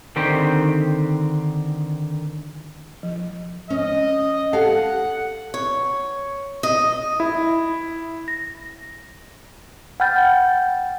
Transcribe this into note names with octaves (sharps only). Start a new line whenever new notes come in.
D3 D#3 C4 G4
F3
C#4 D#5
G4 A4 F5 F#5 A5
C#5
D#5
E4
A#6
F#5 G5 B5 F6 G6 A6